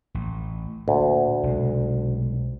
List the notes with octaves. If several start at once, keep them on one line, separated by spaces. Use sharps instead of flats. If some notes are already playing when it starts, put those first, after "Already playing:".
A1
D2 A#2
B1 C3 G#3